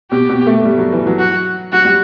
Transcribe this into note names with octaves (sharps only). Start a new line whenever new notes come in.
B2 G4
B2
A3
G3
F#3
E3
F#3
F#4
F#3 F#4
G3